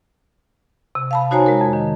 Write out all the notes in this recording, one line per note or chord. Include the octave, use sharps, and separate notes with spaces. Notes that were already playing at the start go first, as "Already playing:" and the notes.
C3
F5 A5 B5
D#4 F#4 C5 C#5 G#5 A#5
G#3 A#4
F2
D#3